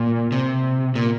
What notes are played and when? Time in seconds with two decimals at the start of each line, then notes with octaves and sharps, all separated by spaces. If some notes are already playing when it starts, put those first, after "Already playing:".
Already playing: A#2
0.32 C3
0.96 A#2